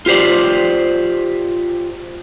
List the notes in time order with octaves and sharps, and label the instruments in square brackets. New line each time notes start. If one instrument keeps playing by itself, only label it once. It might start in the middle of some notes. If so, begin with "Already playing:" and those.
[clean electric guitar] F4 G4 C5 D5